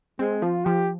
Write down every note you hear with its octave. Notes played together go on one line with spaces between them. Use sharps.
G#3 C4
F3 F4
F3 G4